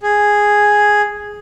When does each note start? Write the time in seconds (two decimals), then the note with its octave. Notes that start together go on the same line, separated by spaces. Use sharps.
0.03 G#4